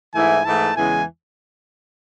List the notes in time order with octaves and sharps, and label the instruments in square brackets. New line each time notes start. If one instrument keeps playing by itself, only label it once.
[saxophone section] G#2 E3 A3 E4 [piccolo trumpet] G#5
[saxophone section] G#2 E3 A3 E4 [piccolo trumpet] A5
[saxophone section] E2 C#3 E3 G#3 [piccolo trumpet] G#5